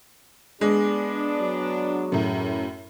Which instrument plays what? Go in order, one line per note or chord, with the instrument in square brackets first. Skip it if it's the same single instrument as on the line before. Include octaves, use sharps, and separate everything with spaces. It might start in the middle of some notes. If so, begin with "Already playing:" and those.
[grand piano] G#3 [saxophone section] B3 D4 [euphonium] G#4
[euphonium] F#3
[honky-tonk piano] F#2 A2